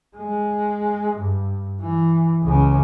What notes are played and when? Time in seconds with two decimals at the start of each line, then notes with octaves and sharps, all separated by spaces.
0.17 G#3
1.16 G2
1.81 E3
2.43 C#2 C#3